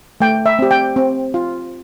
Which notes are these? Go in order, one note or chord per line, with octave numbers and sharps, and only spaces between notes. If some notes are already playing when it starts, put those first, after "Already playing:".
A3 G5
E5
C4 G4
G5
C4
F4